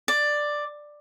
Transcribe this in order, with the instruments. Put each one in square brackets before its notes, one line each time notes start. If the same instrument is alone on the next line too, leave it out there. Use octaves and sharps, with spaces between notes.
[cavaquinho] D5